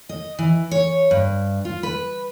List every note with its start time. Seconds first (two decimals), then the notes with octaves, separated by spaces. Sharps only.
0.09 D#5
0.39 E3
0.71 C#5
1.11 G2
1.65 F4
1.83 B4